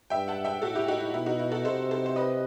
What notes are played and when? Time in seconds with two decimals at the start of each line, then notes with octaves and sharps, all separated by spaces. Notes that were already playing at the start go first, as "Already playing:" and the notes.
0.10 G2 E5 G5
0.28 F#5 A5
0.45 E5 G5
0.62 A2 F#4 A4
0.75 E4 G4
0.88 D#4 F#4
1.00 E4
1.14 B2 E4
1.26 D#4 F#4
1.39 E4
1.52 F#4 A4
1.65 C3 A4 C5
1.91 A4 C5
2.06 C5
2.16 B4 D#5